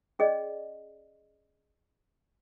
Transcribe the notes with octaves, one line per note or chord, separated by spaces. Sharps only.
C#4 G#4 D5 D#5